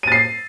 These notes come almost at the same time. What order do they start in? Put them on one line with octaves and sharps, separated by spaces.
D#7 A6 C7